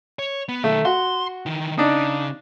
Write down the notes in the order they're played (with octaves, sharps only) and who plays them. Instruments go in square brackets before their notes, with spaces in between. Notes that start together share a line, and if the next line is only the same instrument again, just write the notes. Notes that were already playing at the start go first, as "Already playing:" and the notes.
[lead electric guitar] C#5
B3
[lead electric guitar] B1 D#3 [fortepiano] A3
[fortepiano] F#4 [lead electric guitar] C6
[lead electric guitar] D#3 E3
[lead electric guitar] C#3 [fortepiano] D4 D#4